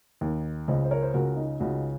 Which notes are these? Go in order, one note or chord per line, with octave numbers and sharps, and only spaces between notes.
D#2 D#3
C#2 C#3 C5 D#5
C5
A#4 C#5
C5
C#2 C#3 F#4 A#4
D#4
C#2 C#3 D#4 F#4